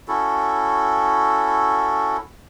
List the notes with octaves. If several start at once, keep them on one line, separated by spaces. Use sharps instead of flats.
C#4 E4 F#4 A4